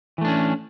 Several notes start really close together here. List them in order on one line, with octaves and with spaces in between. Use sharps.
E3 A3 D4 C#4